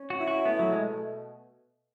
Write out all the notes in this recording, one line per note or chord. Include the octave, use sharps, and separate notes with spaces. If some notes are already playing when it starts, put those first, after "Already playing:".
Already playing: C#4
F#4
E4
F#4
A3 B3
F#3
B2 G#3